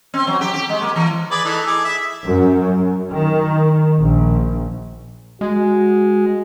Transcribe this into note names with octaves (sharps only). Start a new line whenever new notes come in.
C4
F#3
G4
G4
G#3
A#3
E3
G#4 B4 D5
E3 A3 D#4
G#4 D6
E5
F#2
D#3
A#1
G#3 F#4